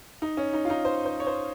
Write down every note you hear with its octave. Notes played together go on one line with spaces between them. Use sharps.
D#4
C#4
D#4
F4
D#4
C5
C5
C#5
C5